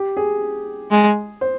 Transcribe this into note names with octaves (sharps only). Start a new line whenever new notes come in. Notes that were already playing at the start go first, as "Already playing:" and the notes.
Already playing: G4
G#4
G#3
C5